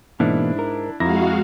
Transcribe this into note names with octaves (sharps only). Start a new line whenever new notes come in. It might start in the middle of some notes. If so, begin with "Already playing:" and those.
G#2 B2 E3 A#3 D4 E4
A#4
F2 G#3 E4 F#4 F5 A#5 A#6